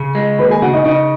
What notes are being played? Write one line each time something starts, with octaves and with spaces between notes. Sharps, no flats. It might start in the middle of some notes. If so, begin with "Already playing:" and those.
Already playing: C#3 G#4
G#3
D#2 B4 B5
G#4 G#5
C#3 F#4 F#5
D#4 D#5
C#3 D#4 D#5